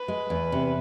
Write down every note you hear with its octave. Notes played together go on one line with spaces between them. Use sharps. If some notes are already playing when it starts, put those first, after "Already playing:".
Already playing: B4
G#3
E2
C3